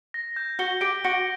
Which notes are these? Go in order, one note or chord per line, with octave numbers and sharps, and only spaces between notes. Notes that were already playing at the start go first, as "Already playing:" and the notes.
A#6
G6
F#4 G7
G4 D7
F#4 A#6